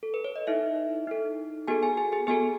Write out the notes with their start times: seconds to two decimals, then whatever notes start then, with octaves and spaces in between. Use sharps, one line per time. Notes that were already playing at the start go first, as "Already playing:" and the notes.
0.03 A4
0.14 B4
0.24 C#5
0.36 D#5
0.47 D#4 E4 A4 E5
1.07 D#4 A4
1.68 B3 F#4 G#4 A4 G#5
1.83 G#4 G#5
1.97 G#4 G#5
2.12 G#4 G#5
2.27 B3 F#4 G#4 A4 G#5